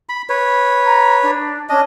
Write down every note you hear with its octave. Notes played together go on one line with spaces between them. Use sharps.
B5
B4 C#5
A#5
D4
C#4 D4 D#5